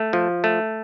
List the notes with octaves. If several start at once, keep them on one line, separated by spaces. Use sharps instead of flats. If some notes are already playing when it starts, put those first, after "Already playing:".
Already playing: A3
F3
A3